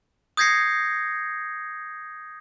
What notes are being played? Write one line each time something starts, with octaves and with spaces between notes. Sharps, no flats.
D#6 G6 G#6 A#6 C7 C#7